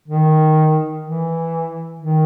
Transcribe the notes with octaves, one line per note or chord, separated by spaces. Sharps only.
D#3
E3
D#3